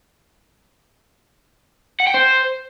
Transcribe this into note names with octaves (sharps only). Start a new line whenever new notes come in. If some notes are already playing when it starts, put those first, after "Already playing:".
F#5
G5
C5